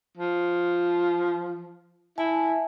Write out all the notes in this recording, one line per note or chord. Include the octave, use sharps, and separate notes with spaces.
F3
E4 E5 G#5 A5